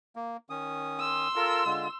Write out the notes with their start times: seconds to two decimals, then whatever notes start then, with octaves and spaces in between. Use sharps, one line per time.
0.16 A#3
0.50 D#3 C#4 D#6
1.00 C6 E6
1.36 F4 A4 A#4
1.66 D3 G#3 F4